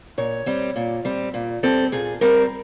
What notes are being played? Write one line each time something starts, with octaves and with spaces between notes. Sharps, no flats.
A#2 C#5
G3 C4
A#2
G3 C4
A#2
G3 C4 A4
A#2 G#4
G3 C4 A#4